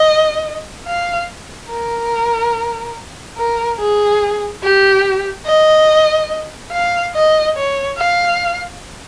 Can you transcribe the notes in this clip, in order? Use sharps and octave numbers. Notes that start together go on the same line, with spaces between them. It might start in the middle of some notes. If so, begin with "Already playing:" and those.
Already playing: D#5
F5
A#4
A#4
G#4
G4
D#5
F5
D#5
C#5
F5